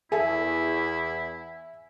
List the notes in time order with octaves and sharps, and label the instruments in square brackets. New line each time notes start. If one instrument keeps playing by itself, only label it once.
[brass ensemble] E2 [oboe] E4 [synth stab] G#4 A4 [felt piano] E5 G#5